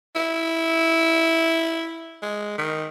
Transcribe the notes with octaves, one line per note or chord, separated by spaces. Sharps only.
E4
G#3
D#3